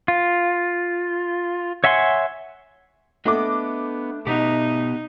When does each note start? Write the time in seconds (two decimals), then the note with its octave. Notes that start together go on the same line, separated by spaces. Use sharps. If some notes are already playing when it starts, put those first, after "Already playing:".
0.08 F4
1.84 C#5 E5 F#5 G#5 C6
3.26 A3 B3 D4 D#5 D6
4.27 B2 B3 D#4 G4